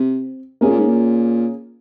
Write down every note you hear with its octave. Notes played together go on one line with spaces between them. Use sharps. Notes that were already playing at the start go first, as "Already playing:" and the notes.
Already playing: C3 C4
C3 A#3 C#4 G#4
A#2
G#2
A#2